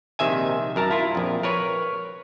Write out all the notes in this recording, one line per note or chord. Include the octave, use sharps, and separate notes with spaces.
A#1 C3 D#3 E5 G#5
F#2 A#4 A5 A#5
E4 F4
A#1 F2
A#4 B4 C#5